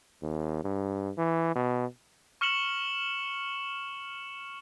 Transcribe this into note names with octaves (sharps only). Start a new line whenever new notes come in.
D#2
G2
E3
B2
C#6 F6 C#7 E7 F#7